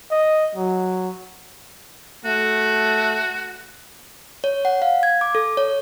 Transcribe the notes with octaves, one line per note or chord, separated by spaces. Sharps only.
D#5
F#3
A3 F#4
C#5
F#5
F5
G#6
D6
A4
C#5